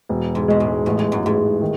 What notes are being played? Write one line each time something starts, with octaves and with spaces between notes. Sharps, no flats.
E1
G#2
B2 G#3
A2
A1 A2
G#2
F#2
A1 G#2
D#3